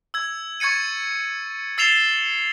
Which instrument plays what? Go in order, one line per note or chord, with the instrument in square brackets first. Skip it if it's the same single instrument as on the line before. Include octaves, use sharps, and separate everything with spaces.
[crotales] E6 G#6
C#6 G#6 A6 C#7 D#7
E6 A6 C7 E7 F7 G7